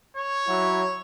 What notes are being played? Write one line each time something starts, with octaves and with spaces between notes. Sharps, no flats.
C#5
F#3 E4 F#4